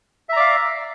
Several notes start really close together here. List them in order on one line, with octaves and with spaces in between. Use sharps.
E5 A#5 D5 F5